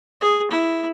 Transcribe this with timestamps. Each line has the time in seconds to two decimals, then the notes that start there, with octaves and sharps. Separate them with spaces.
0.21 G#4
0.51 E4